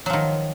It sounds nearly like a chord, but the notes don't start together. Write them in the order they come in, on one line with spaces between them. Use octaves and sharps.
F#3 F3 D#3